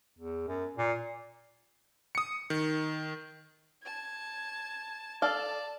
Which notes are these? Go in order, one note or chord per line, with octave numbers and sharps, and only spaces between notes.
E2
F#2
A#2
D#6 C#7
D#3
A5 G#6
A4 D5 F5 A5